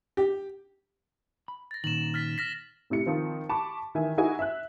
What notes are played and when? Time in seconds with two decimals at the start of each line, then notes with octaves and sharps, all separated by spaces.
0.17 G4
1.48 B5
1.71 A6 A#6
1.84 A#2 D#3 E7 F#7
2.14 F6 A6 B6
2.38 F6 A#6 B6
2.90 A2 C3 E4 C#7
3.06 D#3 F3 C4 F4
3.49 A5 B5 C#6 D6
3.95 D#3 E3 E5 G#5
4.18 D#4 E4 F#4 G#4 D#5 G#5
4.39 E5 E6 F#6